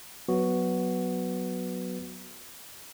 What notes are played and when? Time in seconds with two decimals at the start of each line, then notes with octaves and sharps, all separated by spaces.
0.28 F#3 B3 F#4